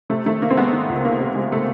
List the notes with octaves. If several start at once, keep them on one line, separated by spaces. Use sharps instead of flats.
C3 A3
D#3 A3
D#3 A#3
C4
G#3 B3
D#3
C#2
C3 A#3
C3
G#3
A3